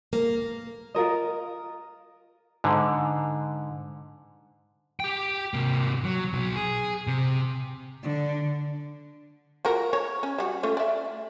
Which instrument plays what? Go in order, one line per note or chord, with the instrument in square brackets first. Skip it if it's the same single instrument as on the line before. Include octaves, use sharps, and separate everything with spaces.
[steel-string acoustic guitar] A#3
[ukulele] F4 A#4 D#5
[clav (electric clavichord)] G#2 D3
[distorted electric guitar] G4 G5
C3 A#3
F#3
B2 F#3
G#4
C3
[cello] D3
[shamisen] F4 F#4 A#4
C#5
C#4
G3 F#4
A3 C#4 F4
D5 E5